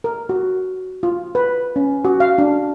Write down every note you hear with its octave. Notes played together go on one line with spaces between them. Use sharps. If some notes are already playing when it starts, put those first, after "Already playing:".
A#4
F#4
F4
B4
C#4
F#4
F5
D4